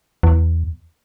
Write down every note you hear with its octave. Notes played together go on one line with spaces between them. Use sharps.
E2